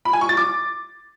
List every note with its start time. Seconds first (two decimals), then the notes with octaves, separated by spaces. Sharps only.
0.05 B5
0.13 G#5
0.21 C#6
0.29 A6
0.37 D6